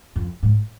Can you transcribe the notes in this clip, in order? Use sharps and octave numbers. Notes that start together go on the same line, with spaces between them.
F2
G#2